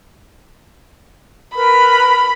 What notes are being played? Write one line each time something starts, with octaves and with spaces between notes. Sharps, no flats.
A#4 B4 B5